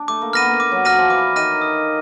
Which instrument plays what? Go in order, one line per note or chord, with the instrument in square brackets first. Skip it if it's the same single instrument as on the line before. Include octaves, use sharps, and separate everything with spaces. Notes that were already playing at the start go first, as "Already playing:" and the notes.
Already playing: [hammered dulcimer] D4
[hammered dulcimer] A3 [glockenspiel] D6
[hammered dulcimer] A#3
[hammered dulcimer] B3 [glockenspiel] F6 A#6 D#7
[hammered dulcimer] A#3
[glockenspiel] D6
[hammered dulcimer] F#3
[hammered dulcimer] F#3 [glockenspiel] F6 A#6 D#7
[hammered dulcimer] F3
[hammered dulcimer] E3 [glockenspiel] D6
[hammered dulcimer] D#3 [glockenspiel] F6 A#6 D#7
[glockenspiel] D#6